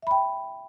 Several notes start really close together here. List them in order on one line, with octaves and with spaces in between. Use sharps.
E5 B5 G5